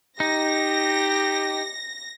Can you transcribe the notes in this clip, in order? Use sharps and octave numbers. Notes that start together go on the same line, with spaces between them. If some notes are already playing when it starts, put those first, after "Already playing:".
D#4 G4 A#6